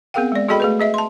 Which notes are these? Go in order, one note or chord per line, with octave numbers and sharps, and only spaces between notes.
B3 C4 G#4 A#4 F5 G5
G#3 D5
F#4 G#4 A4 D#5 G5 B5
A3 G#4 B4
G#4 D#5 E5
A5 C6